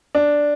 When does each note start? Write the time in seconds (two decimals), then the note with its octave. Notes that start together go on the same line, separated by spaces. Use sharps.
0.15 D4